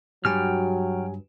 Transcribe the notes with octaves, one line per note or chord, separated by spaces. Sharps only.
G2 F#3 F#4 G4 G5 G#5 F6